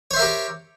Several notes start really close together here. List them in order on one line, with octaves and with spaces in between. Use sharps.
C#5 C5 E5 A#4 G4